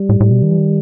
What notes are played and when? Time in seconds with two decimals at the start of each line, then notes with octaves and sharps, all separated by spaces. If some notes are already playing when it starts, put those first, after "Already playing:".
Already playing: G3
0.09 A2
0.20 A2
0.31 B2
0.43 D#3
0.51 E3
0.58 D#3